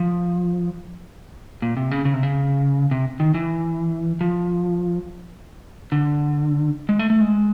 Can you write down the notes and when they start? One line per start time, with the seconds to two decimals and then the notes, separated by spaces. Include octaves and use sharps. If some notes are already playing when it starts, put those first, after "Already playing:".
Already playing: F3
1.62 A#2
1.77 C3
1.91 C#3
2.05 C#3
2.14 C3
2.23 C#3
2.91 C3
3.20 D#3
3.34 E3
4.21 F3
5.92 D3
6.89 G#3
6.99 A3
7.10 A3
7.21 G#3